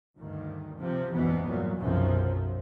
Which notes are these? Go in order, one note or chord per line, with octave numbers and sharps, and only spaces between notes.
D2 G2 D#3
C3 F3
F#1 E2 G#2 B2 E3 B3
G1 A#2 F#3
B1 F#2 C3 F3